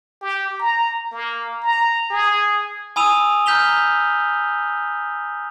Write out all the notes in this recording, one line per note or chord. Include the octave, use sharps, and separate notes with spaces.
G4
A#5
A#3
A#5
G#4
G#5 B5 D#6 E6 D#7 F7
A#5 F6 G6 B6 F7 G7